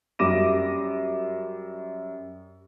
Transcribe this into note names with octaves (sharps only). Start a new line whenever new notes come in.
F#2 G3 D6 A#6 D#7 E7